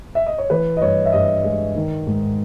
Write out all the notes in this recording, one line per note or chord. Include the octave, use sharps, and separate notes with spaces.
E5
D#5
C#5
E3 B4
D#5
G2 C#5
E5
G2 D#5
G#3
D#3
G#2